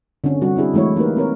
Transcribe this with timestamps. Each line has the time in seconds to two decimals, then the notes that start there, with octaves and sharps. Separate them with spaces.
0.24 D3 C4 C#4
0.42 G3 F#4
0.56 C4 D4 E4 G#4
0.74 E3 G#3 A3 E4 C#5
0.96 A#3 D#4 G4 A#4 B4
1.17 C4 A#4 C#5